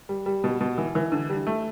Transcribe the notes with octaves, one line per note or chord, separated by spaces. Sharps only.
G3
G3
B2
B2
E3
E3
D3
G3
A3